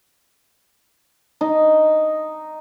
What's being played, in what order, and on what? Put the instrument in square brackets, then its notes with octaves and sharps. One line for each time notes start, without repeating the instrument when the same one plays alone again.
[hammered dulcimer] D#4